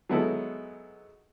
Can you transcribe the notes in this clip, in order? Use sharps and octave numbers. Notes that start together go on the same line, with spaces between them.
F#3 G#3 B3 D#4 E4 A4